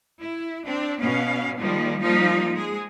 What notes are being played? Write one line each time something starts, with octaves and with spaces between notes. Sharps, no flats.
E4
C4 D4
B2 B3 C#4 F5
D#3 F3 G3 G#3 A#3
F3 G3 A#3 D#4 F4
G#3 G#4